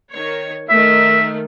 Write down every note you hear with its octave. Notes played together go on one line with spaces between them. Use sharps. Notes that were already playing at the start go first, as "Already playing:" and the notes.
D#3 C#5
D#3 A3 E5